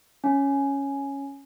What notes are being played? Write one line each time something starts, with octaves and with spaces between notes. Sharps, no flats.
C#4